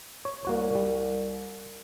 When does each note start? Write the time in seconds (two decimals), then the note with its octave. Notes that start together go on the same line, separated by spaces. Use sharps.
0.25 C#5
0.45 C2 A#3 F#4 C#5
0.75 G3